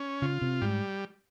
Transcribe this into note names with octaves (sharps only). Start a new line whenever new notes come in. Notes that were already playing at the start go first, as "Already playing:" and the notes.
Already playing: C#4
C#3 F4
C3
G#2 G3